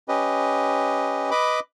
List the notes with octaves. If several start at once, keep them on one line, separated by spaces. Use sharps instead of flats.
C#4 G4 B4 D#5
B4 D#5 B5 D6